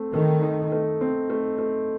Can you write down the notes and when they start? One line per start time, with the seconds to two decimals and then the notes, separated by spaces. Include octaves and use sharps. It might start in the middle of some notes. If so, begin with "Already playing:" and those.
Already playing: A3 C4
0.13 D#3 A3
0.42 D#4
0.72 A3
1.01 C4
1.30 A3
1.58 A3